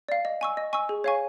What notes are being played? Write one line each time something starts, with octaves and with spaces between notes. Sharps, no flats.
D5 F5
D#5
G#5 C#6 E6
D#5
G#5 C#6 E6
G#4
C#5 F5 G#5 C#6